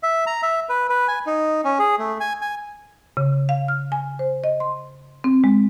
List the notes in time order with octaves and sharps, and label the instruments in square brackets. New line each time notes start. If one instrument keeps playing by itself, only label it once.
[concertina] E5
A#5
E5
B4
B4
G#5
D#4
C#4
G#4
A3
G#5
G#5
[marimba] C#3
F5
F6
G#5
C5
D#5
C6
C4
G#3